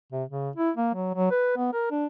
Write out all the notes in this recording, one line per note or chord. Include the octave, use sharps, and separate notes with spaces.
C3
C#3
E4
A#3
F#3
F#3
B4
B3
A#4
D4